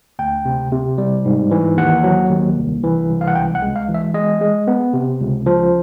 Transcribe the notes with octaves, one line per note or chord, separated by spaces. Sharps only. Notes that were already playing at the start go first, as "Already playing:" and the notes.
D2 G5
C3
C3
G3
G#2
E3
D#2 F#5
F#3
D#2
C2
E3
C2
F5
F#5
C#2 G5
F#5
G#3
F5
E3
E5
G#3 D#5
G#3
B3
C3
C#2
F3